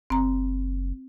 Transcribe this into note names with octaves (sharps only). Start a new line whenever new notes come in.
F#1 C4 A#5